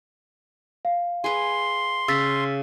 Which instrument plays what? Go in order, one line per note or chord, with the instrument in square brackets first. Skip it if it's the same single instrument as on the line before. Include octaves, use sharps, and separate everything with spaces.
[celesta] F5
[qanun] G#4 B4 [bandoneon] C6
[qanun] C#3 [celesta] E6 A6 B6